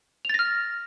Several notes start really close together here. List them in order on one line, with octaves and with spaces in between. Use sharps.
F7 A6 A#6 F6